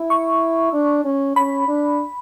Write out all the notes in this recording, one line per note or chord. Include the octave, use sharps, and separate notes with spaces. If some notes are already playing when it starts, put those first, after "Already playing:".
Already playing: E4
C#6
D4
C#4
C#4 B5
D4